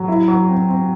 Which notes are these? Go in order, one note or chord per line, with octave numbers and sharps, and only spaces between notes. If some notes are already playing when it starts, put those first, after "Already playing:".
Already playing: F#3
E4
F#3
C4
C4